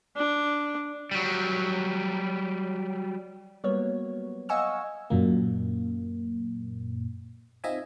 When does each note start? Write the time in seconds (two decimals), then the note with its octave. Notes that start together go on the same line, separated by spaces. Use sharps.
0.16 D4
1.11 F#3 G3
3.64 F#3 G3 A#3 B3 C#5
4.49 D#5 F5 F#5 G#5 C#6 E6
5.10 F#2 A#2 A#3
7.64 C4 D#4 F4 D#5 E5 G#5